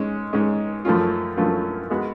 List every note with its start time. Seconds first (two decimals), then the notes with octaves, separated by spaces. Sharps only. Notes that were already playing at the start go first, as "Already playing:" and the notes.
Already playing: G#2 G#3 C#4
0.33 G#2 G#3 C#4
0.85 F#2 F3 A3 C#4 F4
1.37 F#2 F3 A3 C#4 F4
1.90 G#3 B3 F#4